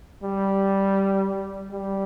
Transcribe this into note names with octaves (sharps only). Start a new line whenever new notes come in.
G3
G3